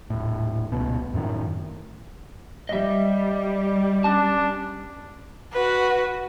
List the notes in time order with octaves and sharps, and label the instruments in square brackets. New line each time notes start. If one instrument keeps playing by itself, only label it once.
[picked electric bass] D#1 A2
D#1 G#1 C#2 B2
F#2 A2 C3 D#3
[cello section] G3 [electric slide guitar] D#5 E5
[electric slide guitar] C#4 A5 [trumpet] D4
[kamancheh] F#4 B4